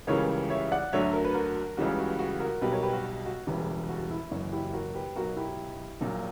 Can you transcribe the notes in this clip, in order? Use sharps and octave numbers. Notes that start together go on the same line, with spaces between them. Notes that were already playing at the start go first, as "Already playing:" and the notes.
C#2 C#3 E3 G3 A#4 C#5
C#5 E5
D5 F#5
D2 D3 F#3 C#5 E5
A#4
B4
F#4 A#4
C#2 C#3 E3 G3 F#4
F#4
F#4
F#4 A#4
B1 B2 G3 G4 B4
A#4 C#5
G4 B4
F#4
F#4
E1 E2 C#3 E3 G3 E4 G4
F#4
E4
F#1 F#2 E3 F#4
E4 G4
F#4 A#4
G4 B4
B1 B2 F#3 F#4 A#4
E4 G4
A#1 A#2 F#3